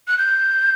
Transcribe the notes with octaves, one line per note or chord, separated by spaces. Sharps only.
F#6
G6